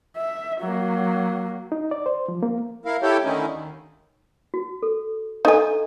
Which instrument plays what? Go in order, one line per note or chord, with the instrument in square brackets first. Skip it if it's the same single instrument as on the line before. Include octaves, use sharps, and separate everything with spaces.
[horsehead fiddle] E5
F#3 A#3
[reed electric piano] D#4
D5
C5
F3
A#3
[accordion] E4 A#4 F5
E4 G4 A4 C#5 G5
D3 D#3 A3 C#4 D#4 E4
D#2
[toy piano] F#4
A4
[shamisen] D#4 G#5 [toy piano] A4 D#5 A#5